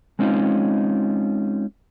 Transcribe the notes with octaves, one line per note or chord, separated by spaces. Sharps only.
G#3 C4 C#4 D#4 F4